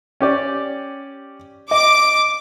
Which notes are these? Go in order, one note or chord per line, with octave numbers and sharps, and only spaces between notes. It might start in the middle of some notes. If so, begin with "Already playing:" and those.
C#4 G4 D5
D#5 D6